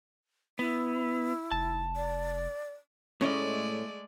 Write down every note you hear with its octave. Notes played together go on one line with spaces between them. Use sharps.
B3 E4
F1 A5
D5
A2 G#3 A3 C#4 D5 D#5